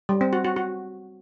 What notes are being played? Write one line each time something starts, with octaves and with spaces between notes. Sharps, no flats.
G3
C4
F#4
F#4
F#4